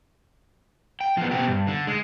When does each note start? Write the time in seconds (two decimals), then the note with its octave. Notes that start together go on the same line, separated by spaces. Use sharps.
1.01 G5
1.17 F3 B3
1.31 B2 G4
1.48 G2
1.67 D3
1.87 G#3